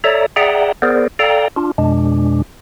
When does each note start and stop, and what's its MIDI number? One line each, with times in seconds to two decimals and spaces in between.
0.04 0.26 69
0.04 0.26 73
0.04 0.26 74
0.04 0.26 76
0.04 0.26 82
0.36 0.72 68
0.36 0.72 74
0.36 0.72 76
0.36 0.72 78
0.36 0.72 79
0.36 0.72 82
0.82 1.08 59
0.82 1.08 68
0.82 1.08 70
0.82 1.08 72
0.82 1.08 74
1.19 1.48 69
1.19 1.48 74
1.19 1.48 77
1.19 1.48 79
1.19 1.48 82
1.56 1.71 62
1.56 1.71 65
1.78 2.42 41
1.78 2.42 47
1.78 2.42 56
1.78 2.42 62